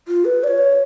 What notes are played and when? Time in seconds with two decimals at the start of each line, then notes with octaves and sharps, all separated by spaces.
0.08 F4
0.25 B4
0.44 D5
0.48 C#5